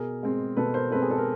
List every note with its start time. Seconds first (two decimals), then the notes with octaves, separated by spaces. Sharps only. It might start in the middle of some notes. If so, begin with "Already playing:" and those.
Already playing: B2 G#4 A#4
0.23 G#3 C4
0.56 B2 A4 B4
0.74 A#4 C5
0.91 G#3 A4 B4
0.95 C4
1.02 G#4
1.11 A4
1.18 A#4